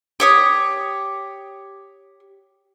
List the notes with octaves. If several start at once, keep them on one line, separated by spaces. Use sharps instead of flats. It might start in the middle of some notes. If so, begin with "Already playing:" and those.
G4 C#5 D#6